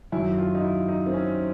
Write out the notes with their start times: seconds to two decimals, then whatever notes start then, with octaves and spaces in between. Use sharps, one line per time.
0.12 F#2 D#3 F#3 E4
0.38 F4
0.55 D#4
0.62 E4
0.88 D#4
1.06 C4
1.13 C#4